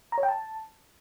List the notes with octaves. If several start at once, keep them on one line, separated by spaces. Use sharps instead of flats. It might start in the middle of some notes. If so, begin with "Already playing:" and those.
A#5
C#5
G5
A5